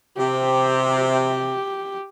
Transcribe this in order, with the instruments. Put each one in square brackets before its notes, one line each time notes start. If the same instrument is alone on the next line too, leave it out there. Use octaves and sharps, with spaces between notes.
[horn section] C3 [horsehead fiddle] G4